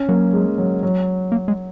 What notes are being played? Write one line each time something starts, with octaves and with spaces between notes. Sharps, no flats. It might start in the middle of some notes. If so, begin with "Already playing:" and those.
Already playing: C#4
F#3 A#3
G#3
F#3
F#3
A#3
G#3